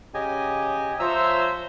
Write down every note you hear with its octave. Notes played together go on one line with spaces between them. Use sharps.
C#3 G4 D#5 G#5
F3 C5 C#5 E5 A#5 E6